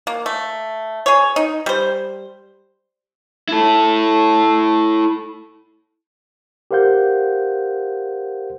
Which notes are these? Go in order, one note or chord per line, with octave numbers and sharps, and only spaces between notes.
A#3
A3
G#4 C#5
D#4
G3 C5
E4 A4
G4 A#4 C5 F5 F#5 G6